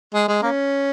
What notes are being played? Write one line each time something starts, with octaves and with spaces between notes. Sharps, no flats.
G#3
G#3
A#3 C#4